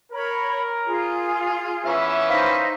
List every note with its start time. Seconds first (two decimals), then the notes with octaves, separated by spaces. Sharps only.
0.12 A#4 C#5 B5
0.87 F4 G#4
1.86 E3 B3 C#4 E5
2.30 D#4 C5 F5 E6 B6